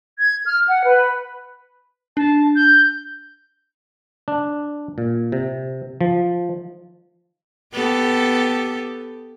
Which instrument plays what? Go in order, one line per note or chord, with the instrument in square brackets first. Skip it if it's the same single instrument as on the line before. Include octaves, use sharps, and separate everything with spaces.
[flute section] G#6
F6
F#5
B4
[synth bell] D4 [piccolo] A5
[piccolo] G6
[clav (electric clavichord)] D4
A#2
C3
F3
[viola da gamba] B3 G4 A4